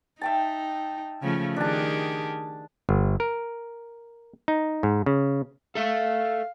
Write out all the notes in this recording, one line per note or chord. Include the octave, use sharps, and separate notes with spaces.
D#4 E5 G5 A5
C#3 F3 A3
D#3 D4 G4 G#4 A5
G1
A#4
D#4
G#2
C#3
A4 E5 F5